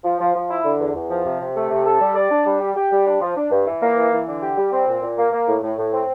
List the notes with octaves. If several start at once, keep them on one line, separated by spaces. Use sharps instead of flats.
F3
F3
F3
E4
D3
E2
E2
F3
C3
C3
A3
C3
A4
G3
D5
D4
G3
G4
G4
G3
D4
F3
D4
G2
E3
A#3
E3
E3
D3
G4
G3
C4
A#2
A#2
A#3
A#3
A2
A2
A2
C4